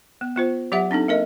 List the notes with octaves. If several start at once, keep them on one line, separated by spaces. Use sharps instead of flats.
B3
B3 F4 C5
F#3 G4 D5 E5 F#5
C4 D4 D#4 A4
A#3 A#4 D#5